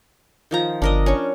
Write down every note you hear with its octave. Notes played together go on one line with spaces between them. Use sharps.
D#3 F3 A#5
G1 D4 A#4 D#5
C#4 D4 C#6